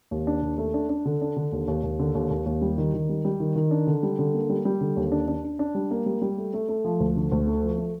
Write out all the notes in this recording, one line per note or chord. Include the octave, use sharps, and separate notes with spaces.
D#2
D4
D#2
A3
D4
D4
D3
D4
D3
D#2
D#2
D#2
D3
D#2
D#2
D#2
G3
D#3
D#3
G3
G3
D#3
D#3
D4
D3
G3
D3
A#3
G3
G3
D3
D#2
D4
D4
D4
D4
G3
A#3
G3
G3
A3
A3
A3
F3
D2
D3
D2
A3
F3
A3